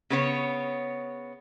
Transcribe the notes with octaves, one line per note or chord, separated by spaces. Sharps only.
C#3 B3 C#5